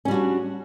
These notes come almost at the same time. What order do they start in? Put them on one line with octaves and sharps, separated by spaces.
C#4 G3 F#4 D4